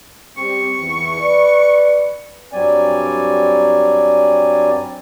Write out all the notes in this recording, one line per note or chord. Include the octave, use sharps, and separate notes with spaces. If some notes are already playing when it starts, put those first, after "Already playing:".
G3 C4 G4 C#6
E2 E3
B4 D5
G2 F#3 G3 C4 D5 G#5